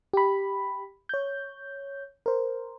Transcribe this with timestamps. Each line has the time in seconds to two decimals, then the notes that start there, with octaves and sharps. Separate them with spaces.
0.13 G4 B5
1.09 C#5 G6
2.26 A#4 C5